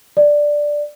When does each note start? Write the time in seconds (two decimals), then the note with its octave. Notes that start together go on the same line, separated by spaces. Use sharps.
0.17 D5